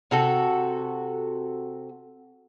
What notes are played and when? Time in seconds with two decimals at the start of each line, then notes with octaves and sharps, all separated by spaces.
0.11 C3 F#4 A4